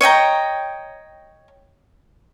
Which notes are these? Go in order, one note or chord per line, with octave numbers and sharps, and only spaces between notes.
C#5 D#5 G5 A#5